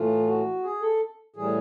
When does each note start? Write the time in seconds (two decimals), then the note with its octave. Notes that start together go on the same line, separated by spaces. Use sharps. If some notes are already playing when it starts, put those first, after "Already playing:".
Already playing: A2 E3 A3 F4
0.27 F#4
0.63 G#4
0.82 A4
1.36 A2 E3 G3 G#4